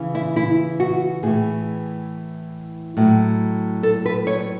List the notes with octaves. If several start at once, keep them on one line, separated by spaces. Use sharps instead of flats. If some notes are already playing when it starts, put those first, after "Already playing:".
Already playing: C#3 E3
E4
E4
F#4
A2 E3 G#4
A2 F#3
A4
B4
C#5